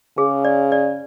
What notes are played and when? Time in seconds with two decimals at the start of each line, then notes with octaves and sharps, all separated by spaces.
0.17 C#3 G#4
0.45 D5
0.72 D5